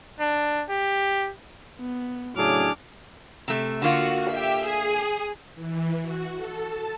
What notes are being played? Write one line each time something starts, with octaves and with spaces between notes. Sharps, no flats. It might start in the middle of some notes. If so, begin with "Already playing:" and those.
D4
G4
B3
A2 C#3 F#3 D4 G#4 D6 F6
C3 A3
D3 A#3 F4 F#4
G4 E5
G#4
E3
F#4
A4
A5